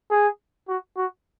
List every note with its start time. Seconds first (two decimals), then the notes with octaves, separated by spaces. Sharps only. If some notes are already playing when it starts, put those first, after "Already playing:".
0.11 G#4
0.69 F#4
0.97 F#4